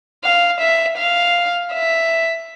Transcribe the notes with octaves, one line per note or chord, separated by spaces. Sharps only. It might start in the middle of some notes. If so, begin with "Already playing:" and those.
F5
E5
F5
E5